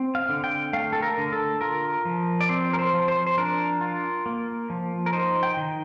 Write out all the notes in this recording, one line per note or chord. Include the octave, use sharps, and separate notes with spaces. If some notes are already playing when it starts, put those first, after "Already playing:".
Already playing: C4
F5
D3
G5
A3 F5
A4
A#4
D3
A4
F4 A#4
F3
D5
C4 C5
A#4
C5
F3
C5
C5
D4 A#4
F4
A#3
F3
A#4
D#4 C5
G5
D#3